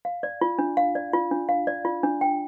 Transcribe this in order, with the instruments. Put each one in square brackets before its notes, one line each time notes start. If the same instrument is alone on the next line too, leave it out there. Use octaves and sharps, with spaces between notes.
[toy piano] F5
D5
F4
D4
F5
D5
F4
D4
F5
D5
F4
D4
G5